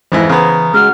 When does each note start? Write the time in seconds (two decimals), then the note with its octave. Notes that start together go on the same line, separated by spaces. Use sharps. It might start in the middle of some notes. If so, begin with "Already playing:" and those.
0.12 F2 G#2 E3 E4 C5 G#6 A#6
0.29 C#3 B3 A#5 D#6 F6
0.74 G#3 C#4 F#4 F#5 F6